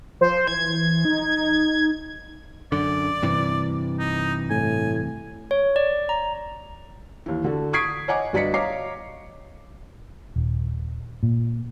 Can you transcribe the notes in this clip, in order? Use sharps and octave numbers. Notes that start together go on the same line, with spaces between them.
F3 C5
E3 G#6
D#4
F#2 D3 D5
G2 C3 E3
D#4
A2 G#5
C#5
D5
A#5
D#2 E3
D3 F#4 A4
C#6 D#6 G#6 B6 C7 D7
C#5 D#5 F#5 G#5 D6
G1 F#4 D5 D#5 B6 C#7
C#5 D#5 F5 A#5 D6 C7
D#1
A#2